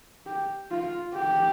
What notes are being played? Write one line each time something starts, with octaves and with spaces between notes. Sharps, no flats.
G4
F4
G4